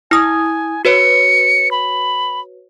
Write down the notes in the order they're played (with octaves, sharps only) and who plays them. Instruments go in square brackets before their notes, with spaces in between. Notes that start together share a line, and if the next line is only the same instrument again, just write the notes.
[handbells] E4 D#6 [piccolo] G#5
[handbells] F#4 B4 C#5 [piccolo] C#7
[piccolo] B5